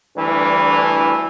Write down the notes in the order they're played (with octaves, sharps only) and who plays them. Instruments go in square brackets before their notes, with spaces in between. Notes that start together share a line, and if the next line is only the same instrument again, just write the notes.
[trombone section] D2 G2 E3